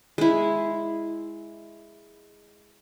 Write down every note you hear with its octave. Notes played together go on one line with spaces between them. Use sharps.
G#3 E4